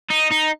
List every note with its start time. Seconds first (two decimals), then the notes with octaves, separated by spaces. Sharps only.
0.10 D#4
0.31 D#4